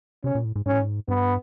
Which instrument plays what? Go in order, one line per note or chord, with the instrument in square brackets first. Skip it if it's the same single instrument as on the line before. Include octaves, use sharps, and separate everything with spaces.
[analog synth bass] C3 [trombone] C#4
[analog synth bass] A#2
A2
G#2
[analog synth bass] G#2 [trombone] C#4
[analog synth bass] A2
G#2
[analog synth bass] G2 [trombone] B3